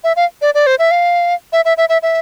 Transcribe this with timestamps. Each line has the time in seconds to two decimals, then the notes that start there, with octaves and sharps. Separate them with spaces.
0.04 E5
0.16 F5
0.42 D5
0.54 D5
0.67 C5
0.79 E5
0.91 F5
1.53 E5
1.65 E5
1.77 E5
1.89 E5
2.03 E5